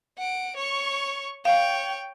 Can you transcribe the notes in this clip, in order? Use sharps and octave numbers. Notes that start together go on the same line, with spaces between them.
F#5 D7
C#5 C#6
C#5 F5 G5